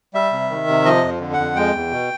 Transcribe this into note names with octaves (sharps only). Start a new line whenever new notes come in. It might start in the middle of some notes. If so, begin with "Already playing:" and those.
G3 E5
C3
D#3
C3
F3 D#5
F2
D3
F2 F#5
G#3 G5
E2
B2